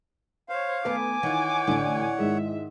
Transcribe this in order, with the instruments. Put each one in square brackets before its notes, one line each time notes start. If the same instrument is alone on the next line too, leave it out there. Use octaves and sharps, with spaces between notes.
[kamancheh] C5 C#5 [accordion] F5
[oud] D#3 A3 B3 [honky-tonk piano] B4 [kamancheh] G#5 D6
[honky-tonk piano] D#3 [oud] E3 F4 [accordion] C#5 F#5
[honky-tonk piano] A1 D3 [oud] E4 D5
[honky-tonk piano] G#2 D#3 G#3 [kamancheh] E5